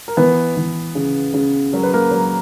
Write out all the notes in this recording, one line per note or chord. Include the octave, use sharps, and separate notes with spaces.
A#4
E3 B3 B4
E3
C#3
C#3
F#3 A#4
B4
A#3 A#4
F#3